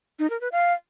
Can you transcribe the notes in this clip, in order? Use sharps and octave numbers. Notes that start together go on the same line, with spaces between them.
D#4
A#4
B4
F5